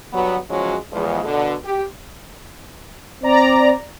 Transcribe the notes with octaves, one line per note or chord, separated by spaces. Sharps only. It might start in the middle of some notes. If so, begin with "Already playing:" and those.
G2 F#3 G3 B3
E2 F3 F#3 G#3 C#4 F#4
E2 F3 G#3
B2 D3
G4
C4 D5 A#5